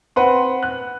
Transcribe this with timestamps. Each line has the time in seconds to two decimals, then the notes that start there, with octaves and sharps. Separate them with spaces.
0.16 C4 B4 F#5 C6
0.63 F#6